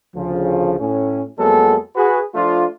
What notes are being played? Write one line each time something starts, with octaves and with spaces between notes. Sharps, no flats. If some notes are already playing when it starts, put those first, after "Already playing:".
D2 C#3 F3
A2 C#4
F2 F#3 G#3 A#3 B3 A4
F#4 G#4 B4
F3 A3 D4 F4